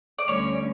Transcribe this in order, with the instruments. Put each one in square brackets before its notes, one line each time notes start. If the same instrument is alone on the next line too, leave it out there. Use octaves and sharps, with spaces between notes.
[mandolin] D5
[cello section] D2 D3 G3 C#4 [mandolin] C#5